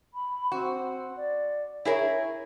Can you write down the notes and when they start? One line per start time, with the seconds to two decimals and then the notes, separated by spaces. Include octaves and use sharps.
0.13 B5
0.52 C4 F#4
1.16 D5
1.85 E4 G#4 A#4 C#5